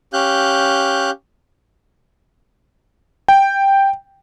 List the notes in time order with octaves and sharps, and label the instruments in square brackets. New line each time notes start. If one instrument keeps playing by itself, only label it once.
[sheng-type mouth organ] C#4 G4 F5 F#6 G6
[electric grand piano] G5